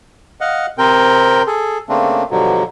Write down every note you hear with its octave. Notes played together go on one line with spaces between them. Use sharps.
D#5 F5 F#5
C3 C4 A#4 G5
G#4 A4
C#3 A3 A#3 C4 D4
G2 B2 D3 F3 F#3